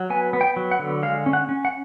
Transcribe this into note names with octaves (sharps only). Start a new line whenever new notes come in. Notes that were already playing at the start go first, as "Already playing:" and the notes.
Already playing: F#3
B3 G#5
B3
G5
F#3
F#5
D3
G#3 F5
C#4
F#5
C#4
F#5